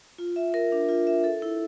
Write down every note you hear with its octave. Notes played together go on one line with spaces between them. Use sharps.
F4
E5
A#4
D4
F4
E5
A4
E4